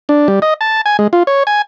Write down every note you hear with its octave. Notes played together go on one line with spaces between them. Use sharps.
D4
G3
D#5
A5
G#5
G#3
F4
C#5
G#5